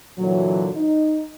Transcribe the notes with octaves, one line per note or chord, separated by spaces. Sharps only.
A#2 D3 E3 F#3
D#4